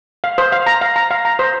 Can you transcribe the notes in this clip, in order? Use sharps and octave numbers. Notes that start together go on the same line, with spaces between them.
F5
C5
F5
A#5
F5
A#5
F5
A#5
C5